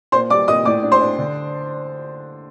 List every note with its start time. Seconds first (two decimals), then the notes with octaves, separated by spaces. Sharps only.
0.12 A#2 C5 C6
0.30 G3 D5 D6
0.48 A#2 D#5 D#6
0.65 A2 D5 D6
0.83 D4
0.92 C5 C6
1.01 D4
1.18 D3